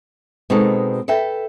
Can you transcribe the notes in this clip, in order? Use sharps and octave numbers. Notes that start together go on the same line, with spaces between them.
B2 G#3 C4 D#4 F#4 A4
A4 B4 E5 G5